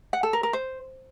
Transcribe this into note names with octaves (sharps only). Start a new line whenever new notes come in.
F#5
A4
A#4
A#4
C5